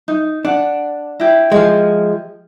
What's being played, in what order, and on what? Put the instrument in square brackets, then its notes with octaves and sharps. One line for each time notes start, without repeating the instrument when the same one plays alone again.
[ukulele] D#4
[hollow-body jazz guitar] D4 [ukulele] F#5
[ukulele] E4 G4
[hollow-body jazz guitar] F3 G#3